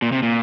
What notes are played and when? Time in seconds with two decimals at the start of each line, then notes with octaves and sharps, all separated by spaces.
0.02 A#2
0.12 C3
0.23 A#2